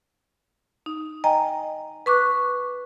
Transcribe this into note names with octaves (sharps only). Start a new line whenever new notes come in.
D#4
D#5 G5 G#5 A#5
B4 C#6 D6 F#6